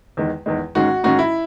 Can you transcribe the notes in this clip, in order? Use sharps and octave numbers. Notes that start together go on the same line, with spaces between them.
E2 D#3 G#3
E2 D#3 G#3
G#2 D#3 G#3 C#4 F#4
G#2 D#3 G#3 C#4 F#4
E4